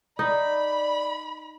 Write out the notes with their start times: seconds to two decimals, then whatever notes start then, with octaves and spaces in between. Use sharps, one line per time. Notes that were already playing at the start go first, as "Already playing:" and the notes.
0.19 D#4 D5 B5